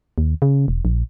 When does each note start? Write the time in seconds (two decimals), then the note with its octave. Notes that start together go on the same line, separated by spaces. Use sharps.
0.18 D#2
0.42 C#3
0.68 E1
0.85 A#1